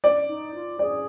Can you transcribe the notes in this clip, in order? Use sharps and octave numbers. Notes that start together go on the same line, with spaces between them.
D5
D#4
F4
G#4 D5